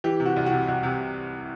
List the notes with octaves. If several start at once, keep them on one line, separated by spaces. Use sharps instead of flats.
E3 G4
C3
F#4
C2
F#4
C3
C2 F#4
C3